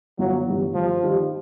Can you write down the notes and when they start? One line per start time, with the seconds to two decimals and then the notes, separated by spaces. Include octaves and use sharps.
0.19 G1 F#3
0.46 G2 E3
0.75 G2 F3
1.03 D#3 G3